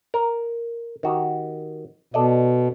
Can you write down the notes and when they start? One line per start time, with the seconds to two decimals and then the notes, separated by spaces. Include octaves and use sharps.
0.14 A#4
1.03 D#3 F#4 G4
2.14 B2 A4 D5 D#5